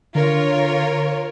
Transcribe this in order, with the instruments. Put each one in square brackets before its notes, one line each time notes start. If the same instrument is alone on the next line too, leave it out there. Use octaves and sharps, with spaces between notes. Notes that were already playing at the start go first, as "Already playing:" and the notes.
[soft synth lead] D3 [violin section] F4 A#4 C#5